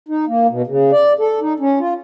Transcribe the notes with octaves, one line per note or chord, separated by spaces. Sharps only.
D#4
A#3
B2
C#3
D5
A4
D#4
C#4
F4